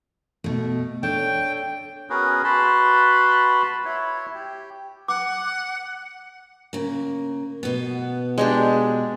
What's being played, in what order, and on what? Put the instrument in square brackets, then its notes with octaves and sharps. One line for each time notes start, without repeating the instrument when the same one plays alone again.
[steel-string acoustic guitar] B2 A3
[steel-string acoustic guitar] D4 A4 C#5 [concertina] G5
[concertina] B3 C#4 F#4 G#4 A#4 B4
F#4 B4 A5 B5 C6
E4 C#5
G4
[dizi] F#5 [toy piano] D6
[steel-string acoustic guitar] C#3 A#3
B2 B3
[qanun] G#3 D4 G4